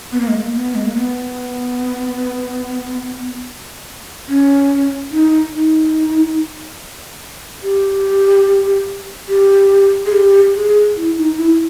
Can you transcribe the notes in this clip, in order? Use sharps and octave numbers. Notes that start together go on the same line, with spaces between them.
B3
A#3
G#3
A#3
B3
G#3
A#3
B3
C#4
D#4
D#4
G4
G4
G#4
G4
G#4
E4
D#4
E4